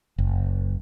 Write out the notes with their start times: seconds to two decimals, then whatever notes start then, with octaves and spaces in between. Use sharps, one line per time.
0.18 F#1